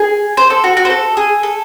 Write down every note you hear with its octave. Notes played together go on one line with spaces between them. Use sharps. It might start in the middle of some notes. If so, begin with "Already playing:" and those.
Already playing: G#4
C5
A4
F#4
F#4
C5
A4
G#4
A4